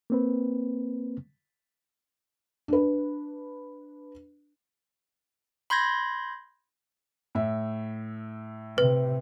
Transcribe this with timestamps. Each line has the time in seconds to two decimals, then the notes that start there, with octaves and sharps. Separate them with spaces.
0.10 A#3 C4 B4
2.68 D4 B4
5.70 B5 C6 G6 G#6 A#6
7.35 A2 E5
8.78 C3 B4